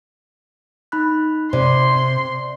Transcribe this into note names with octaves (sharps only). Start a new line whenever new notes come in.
D#4 B5 F#6
C3 C5 D5 C6